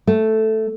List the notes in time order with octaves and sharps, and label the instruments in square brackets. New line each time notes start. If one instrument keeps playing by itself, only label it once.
[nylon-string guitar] A3